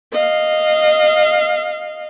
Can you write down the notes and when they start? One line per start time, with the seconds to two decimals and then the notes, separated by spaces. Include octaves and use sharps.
0.13 D#5 F5